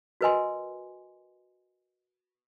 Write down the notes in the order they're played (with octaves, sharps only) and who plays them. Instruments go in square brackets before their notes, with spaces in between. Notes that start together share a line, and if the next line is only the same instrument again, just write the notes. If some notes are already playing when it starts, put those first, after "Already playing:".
[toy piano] F#4 A#4 B4 D#5 G#5 C6